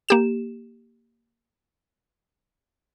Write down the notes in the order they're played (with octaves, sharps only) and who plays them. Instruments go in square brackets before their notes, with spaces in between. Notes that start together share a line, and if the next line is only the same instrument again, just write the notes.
[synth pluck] A#3 G4 E7